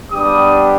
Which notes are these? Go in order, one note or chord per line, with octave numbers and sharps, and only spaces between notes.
G3 B3 D4 G4 D#6